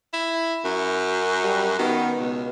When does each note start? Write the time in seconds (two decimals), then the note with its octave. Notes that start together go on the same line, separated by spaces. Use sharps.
0.13 E4
0.65 F#2
1.44 G3
1.79 D#3 B3
2.18 C#2 B2